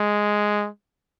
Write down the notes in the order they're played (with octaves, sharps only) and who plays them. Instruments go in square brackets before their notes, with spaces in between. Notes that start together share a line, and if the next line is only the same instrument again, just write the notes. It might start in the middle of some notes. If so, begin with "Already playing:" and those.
Already playing: [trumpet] G#3